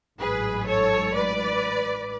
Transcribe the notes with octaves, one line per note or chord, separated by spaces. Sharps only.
A1 G#2 F#3 G#4 B4
A4 C#5
B4 D5